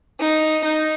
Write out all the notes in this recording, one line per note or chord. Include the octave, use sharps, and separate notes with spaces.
D#4
D#4